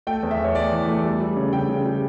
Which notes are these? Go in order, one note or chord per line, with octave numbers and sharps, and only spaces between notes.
A3 G5
E2
E5
E2
C#5
A3 D5
E3
A3
G3
G3
C#3
C#3 G5
C#3
G3